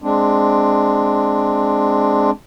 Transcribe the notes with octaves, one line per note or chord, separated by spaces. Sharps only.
G#3 C4 D4